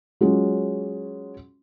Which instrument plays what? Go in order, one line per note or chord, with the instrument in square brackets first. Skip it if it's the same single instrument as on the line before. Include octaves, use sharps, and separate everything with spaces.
[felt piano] F#3 G#3 C#4 F4